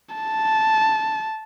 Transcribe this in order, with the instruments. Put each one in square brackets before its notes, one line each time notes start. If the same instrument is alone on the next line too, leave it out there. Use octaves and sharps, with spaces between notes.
[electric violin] A5